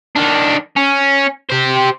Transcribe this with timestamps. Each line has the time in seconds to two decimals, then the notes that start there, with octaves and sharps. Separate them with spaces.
0.16 D#3 D4
0.77 C#4
1.50 G4 C5